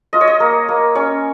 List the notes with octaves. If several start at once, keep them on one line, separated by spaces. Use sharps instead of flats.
F4 D#5
C#5
D#5
A#3
A#3
C#4 C#5